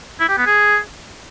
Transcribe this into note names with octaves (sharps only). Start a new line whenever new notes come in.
E4
G4
B3
G#4